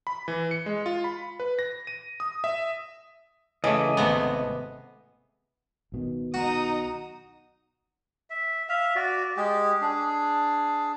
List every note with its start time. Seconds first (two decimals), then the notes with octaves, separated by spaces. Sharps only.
0.07 B5
0.28 E3
0.51 C#7
0.66 G#3
0.86 F4
1.04 B5
1.40 B4
1.59 A#6
1.87 D#7
2.20 D#6
2.44 E5
3.64 C#3 E3 A3 D#5 G#5 D6
3.97 G#1 C3 A3 B3
5.92 B1 B2 D#3
6.34 D#4 F#4 A#5 D#6
8.30 E5
8.69 E5 F5
8.96 F#4 D5
9.37 G#3 G4
9.81 D4 G#4